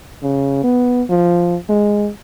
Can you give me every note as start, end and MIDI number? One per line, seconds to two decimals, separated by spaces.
0.23 0.62 49
0.64 1.03 59
1.10 1.57 53
1.69 2.10 56